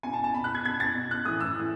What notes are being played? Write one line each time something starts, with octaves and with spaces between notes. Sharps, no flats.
B2 G#5
A5
A5
B2 B5
F#6
G#6
B2 G#6
A6
B2
F#6
A2 E3 D#6
E6
A2 E3